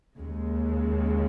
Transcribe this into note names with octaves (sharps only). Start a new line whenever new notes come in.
D#2 C#3 G#3